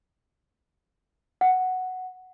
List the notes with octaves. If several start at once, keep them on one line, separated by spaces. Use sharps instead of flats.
F#5